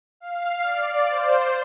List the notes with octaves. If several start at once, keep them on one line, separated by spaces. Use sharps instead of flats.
F5
D5
C5